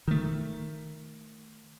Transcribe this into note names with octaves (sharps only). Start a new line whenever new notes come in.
D#3 A3